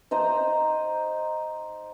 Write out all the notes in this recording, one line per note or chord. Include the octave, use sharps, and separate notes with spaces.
D#4 C5 D#5 A#5